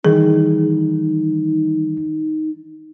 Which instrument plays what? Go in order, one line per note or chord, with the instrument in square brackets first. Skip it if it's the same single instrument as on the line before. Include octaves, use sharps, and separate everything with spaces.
[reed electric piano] D#3 E3 G3 [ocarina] D#4 [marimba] G#4